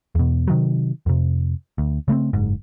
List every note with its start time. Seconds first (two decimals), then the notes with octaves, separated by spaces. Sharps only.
0.15 E2 B2
0.48 C3 D#3 F#3
1.06 F2 C3
1.78 D2
2.08 C#3 A3 A#3 C4
2.33 F#1 G#2